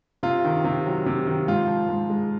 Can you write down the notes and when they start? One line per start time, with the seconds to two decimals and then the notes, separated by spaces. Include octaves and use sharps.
0.23 C3 F4
0.45 D#3
0.64 C3
0.86 F#3
1.06 C3
1.27 D#3
1.48 G#2 F4
1.68 F3
1.89 G#2
2.10 G#3